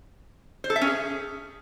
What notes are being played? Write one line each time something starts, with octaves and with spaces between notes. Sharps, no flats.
C5
A4
E5
C#4
G#4